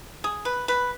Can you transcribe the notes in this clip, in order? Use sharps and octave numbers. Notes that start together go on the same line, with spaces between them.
G#4
B4
B4